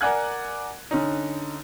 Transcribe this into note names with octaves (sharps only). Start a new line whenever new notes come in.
A#4 D5 F#5 G#5 F#6 G#6
D3 C#4 D#4